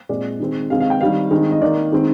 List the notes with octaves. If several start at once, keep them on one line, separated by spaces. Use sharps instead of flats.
A#2 G#3 C4 D5
D#3 G#3 C4
C3 D#3 G#3 C4 F5
F5
G5
D#3 G3 C4 F5
D#3 G#3 C4
D#5
D#3 A#3 D5
D#3 G#3 C4